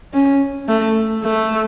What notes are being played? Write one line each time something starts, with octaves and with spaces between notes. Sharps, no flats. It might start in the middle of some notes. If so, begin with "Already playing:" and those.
C#4
A3
A3